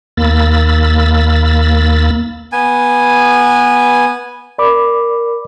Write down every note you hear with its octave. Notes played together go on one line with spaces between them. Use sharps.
D#2 A#3 B5 E6 A6
B3 G#5
A#4 D5 B5 D6